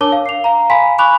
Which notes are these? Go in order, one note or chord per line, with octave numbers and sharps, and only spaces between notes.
D4 A#4 C#5 A5 D6 G7
F5
C7 F7
F5 A#5
F5 G#5 B5 C6 B6
G#5 B5 C#6 D6 F#6 F7